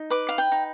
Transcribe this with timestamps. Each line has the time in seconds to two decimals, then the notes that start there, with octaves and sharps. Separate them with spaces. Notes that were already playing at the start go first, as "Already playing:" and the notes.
Already playing: D#4
0.10 B4 D6
0.29 F5
0.38 G5
0.52 D#4